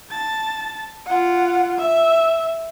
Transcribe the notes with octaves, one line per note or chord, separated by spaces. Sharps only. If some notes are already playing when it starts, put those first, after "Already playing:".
A5 A6
F4 F#5
E5